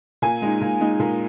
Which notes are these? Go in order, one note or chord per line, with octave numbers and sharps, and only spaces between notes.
A#2 G#5
G#3 D#4
A#2
G#3 D#4
A#2